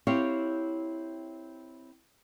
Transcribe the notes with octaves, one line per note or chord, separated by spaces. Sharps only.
C4 E4 G4 C#5 E5 F5